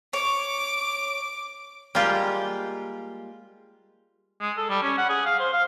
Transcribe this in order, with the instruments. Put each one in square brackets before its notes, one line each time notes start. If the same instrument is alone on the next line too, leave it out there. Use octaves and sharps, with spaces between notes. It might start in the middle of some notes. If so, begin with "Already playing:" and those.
[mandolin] C#5 [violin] D6
[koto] G3 G#3 A#3 F4 G4
[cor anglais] G#3
A4
G3
C#4
F#5
G#4
F5
C5
F5